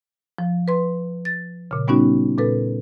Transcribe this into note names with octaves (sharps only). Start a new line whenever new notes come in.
F3
B4 C6
A6
A#2 C#3
G3 B3 C#4 D#4 F#4
A#2 A4 B4